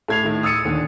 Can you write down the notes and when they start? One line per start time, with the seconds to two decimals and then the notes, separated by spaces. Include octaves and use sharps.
0.08 A2 A3 G#6 C7 F7
0.23 A2 D#3
0.43 D#6 E6 A6 C#7 D#7
0.65 D#2 A#2 D3 D#3